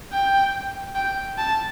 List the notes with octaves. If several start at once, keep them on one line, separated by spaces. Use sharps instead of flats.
G5
G5
A5